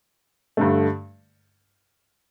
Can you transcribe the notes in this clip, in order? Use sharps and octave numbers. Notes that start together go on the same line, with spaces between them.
G2 D3 A3